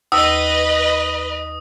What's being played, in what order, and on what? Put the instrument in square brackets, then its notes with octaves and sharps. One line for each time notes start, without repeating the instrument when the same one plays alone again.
[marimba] D#2 E6 [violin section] B4 D#5 [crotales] D#6